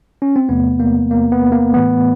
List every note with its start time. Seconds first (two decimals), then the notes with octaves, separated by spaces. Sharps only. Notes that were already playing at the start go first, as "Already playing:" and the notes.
0.22 C#4
0.36 C4
0.49 E2 C3 F3 A3 B3
0.80 A#3
1.11 A#3
1.32 B3
1.52 A#3
1.73 A2 E3 A3 B3